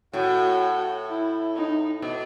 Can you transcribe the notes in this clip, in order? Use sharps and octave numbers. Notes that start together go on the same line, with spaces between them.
A2 F#4
E4
D#4
B2